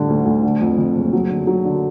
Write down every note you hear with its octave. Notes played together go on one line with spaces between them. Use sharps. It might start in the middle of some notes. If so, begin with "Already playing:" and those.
Already playing: A2 D3 G3
D2
D2
D3
F2
F2
F#1
F#3
D3
F#3
D3